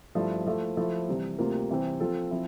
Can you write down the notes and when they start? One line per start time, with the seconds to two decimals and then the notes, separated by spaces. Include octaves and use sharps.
0.15 G2 F3 A3 E4
0.46 F3 A3 E4
0.77 F3 A3 E4
1.08 C2 C3 E3
1.39 D2 C3 G3 A#3 F4
1.70 C3 E3 G3 C4
2.00 F3 C4 F4 A4
2.31 F3 C4 E4